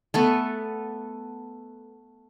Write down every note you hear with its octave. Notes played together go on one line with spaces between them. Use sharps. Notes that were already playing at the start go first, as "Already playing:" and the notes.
A3 B3 A4